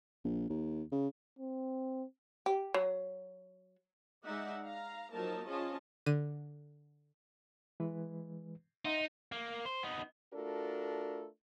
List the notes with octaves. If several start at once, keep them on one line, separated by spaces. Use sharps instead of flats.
A#1
D#2
C#3
C4
G4
F#3
G#3 D#4 D5 E5 F#5
F5 A#5
F3 F#3 A#3 D#4 A#4 A5
F3 C#4 F4 G#4 D#5 A5
D3 D#7
E3 G#3 B4
D#4 E5 F#5 C6
A#3
C5
B3 D#4
A3 D4 F4 F#4 A4 A#4